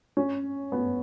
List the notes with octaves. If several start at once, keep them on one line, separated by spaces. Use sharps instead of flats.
C#4
B3